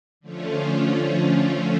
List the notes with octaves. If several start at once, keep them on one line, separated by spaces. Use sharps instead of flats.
D3 F3 A3 C#4 F4